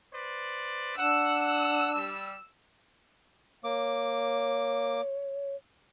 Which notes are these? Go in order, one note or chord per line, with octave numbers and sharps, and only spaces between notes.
B4 C5 D5
D4 F#5 E6
G3
A#3 C#5 D6